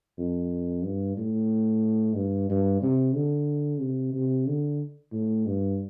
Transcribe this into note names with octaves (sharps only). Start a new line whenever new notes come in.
F2
G2
A2
G2
G2
C3
D3
C3
C3
D3
A2
G2